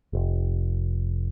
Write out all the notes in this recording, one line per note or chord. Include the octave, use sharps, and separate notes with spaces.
F1